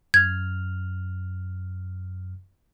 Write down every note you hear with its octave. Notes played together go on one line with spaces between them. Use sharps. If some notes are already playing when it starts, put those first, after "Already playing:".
F#2 F6 G#6